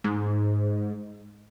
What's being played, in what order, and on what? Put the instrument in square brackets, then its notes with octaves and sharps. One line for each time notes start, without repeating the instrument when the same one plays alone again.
[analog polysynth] G#2